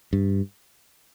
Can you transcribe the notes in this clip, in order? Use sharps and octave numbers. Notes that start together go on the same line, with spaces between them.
G2